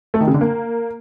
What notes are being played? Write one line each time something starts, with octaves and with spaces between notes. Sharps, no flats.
A3
D#3
C#3
D3
A#3